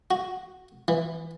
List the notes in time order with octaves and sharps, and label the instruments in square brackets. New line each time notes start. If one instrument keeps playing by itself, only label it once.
[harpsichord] F#4
E3